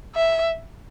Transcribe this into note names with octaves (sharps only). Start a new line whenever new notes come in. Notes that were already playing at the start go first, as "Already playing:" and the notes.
E5